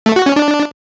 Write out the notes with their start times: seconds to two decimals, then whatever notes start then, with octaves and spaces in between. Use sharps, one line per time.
0.06 A3
0.16 F#4
0.26 C#4
0.36 D4